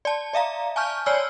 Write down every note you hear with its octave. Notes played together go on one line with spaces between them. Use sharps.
D5 A5
D5 E5 F5 A#5
G#5 A5 C#6 F6 G6
C#5 D5 G#5 E6 F6